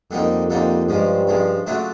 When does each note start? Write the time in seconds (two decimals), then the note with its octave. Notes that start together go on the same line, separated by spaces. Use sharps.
0.11 F2 D3 G3 A#3 D#4
0.50 F2 D3 G3 A#3 D#4
0.89 G2 C#3 F3 G#3
1.27 C#3 F3 G#3
1.66 C#3 F#3 A3 D4 F4